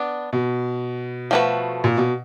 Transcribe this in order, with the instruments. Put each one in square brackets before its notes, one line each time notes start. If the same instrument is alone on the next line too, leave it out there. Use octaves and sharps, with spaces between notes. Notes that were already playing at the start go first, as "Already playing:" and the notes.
Already playing: [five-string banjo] B3 D4
[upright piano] B2
[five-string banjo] F3 A3 D4 F#4 B4
[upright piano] A#2
B2